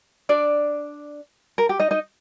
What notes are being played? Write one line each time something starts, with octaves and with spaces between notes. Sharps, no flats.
D4 D5
A#4
G4
D#4 D#5
D#4 D#5